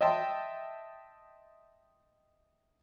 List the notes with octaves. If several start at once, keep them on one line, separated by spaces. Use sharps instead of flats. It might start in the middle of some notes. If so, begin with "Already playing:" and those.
D#5 E5 G5 A5 C6